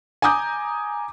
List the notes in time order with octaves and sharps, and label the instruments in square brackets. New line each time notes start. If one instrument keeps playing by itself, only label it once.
[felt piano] G#5 A#5 D6 D#6 G6